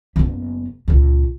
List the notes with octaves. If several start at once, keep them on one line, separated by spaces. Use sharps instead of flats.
F#1 B3
C#2 A#2